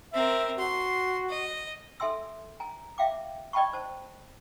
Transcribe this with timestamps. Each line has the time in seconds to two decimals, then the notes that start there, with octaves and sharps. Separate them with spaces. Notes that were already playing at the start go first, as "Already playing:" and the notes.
0.13 C4 A#4 E5
0.59 F#4 C6
1.29 D#5
2.00 A4 E5 G#5 C6 E6
2.60 G#5 A#5
2.98 E5 F5 G5 D6
3.53 D5 D#5 G5 A5 B5 C#6
3.73 C5 A5